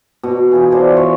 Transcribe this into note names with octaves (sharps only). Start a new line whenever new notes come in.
B2
E3 F4 G#4
A4 C5 D5
C#5